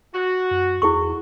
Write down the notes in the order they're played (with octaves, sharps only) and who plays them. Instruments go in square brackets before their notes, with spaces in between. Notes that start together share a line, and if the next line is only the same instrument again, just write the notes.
[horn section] F#4
[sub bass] F#2
[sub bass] E2 [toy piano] E4 G#4 C#6